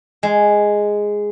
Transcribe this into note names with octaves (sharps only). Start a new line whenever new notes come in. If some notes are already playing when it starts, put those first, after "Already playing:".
G#3